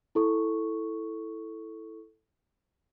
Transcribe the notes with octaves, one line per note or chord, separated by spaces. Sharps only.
E4 A4 C#6